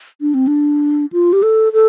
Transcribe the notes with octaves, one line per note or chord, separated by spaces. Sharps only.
D4
C4
D4
F4
G4
A4
A4